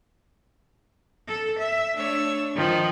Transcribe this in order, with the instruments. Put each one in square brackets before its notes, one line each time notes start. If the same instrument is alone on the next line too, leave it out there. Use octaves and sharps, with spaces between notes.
[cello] A4
E5
[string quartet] A3 C#5 E6 [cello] D4
[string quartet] D#3 F3